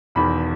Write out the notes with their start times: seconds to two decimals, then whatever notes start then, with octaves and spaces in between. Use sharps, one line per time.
0.15 E1 E2 D#3 B5